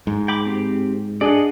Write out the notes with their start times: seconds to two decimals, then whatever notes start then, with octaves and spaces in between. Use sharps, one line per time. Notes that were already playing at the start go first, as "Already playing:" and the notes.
0.07 G#2
0.28 G5 B5 D6
0.46 C4 G4
1.21 D4 G#4 D5 D#5 F#5